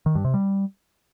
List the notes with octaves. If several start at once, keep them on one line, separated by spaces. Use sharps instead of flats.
D#3
G2
C3
G3